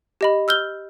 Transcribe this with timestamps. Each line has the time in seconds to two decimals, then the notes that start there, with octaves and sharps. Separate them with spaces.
0.21 G4 D#5 B5
0.48 E6 F6 G6 G7